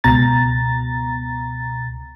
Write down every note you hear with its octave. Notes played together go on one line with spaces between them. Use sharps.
C#2 B2 A#5 A6